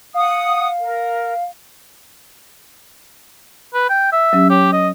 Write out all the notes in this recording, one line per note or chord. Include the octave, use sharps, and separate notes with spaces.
F5 F#5 D#6
A#4
B4
G5
E5
F#3 C#4 G4
G4 C#5
D#5